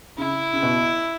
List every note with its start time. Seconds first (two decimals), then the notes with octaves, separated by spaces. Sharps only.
0.18 C#3 E4
0.53 C#3
0.62 B2